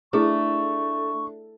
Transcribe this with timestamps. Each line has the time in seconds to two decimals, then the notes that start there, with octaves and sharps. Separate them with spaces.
0.13 A3 D4 E4 G#4 B4 C#6